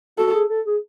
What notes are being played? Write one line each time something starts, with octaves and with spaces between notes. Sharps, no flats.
F#4 A4
G#4
A4
G#4